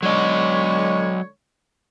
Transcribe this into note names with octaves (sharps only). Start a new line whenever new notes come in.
D3 F#3 G#3 C#5 D#5